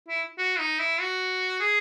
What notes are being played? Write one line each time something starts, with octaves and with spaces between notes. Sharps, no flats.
E4
F#4
D#4
E4
F#4
G#4